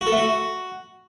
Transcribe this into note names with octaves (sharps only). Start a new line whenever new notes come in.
F#4
A4
A3
F#4